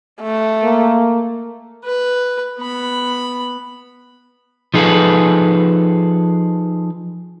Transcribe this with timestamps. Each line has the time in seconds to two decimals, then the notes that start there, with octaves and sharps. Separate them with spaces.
0.21 A3
0.64 A#3
1.85 B4
2.60 B3 B5
4.74 F3 D#4 G#4 A4 B4